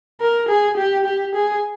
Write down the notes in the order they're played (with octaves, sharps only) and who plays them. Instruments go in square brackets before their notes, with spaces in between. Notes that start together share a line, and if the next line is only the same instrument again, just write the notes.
[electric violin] A#4
G#4
G4
G4
G#4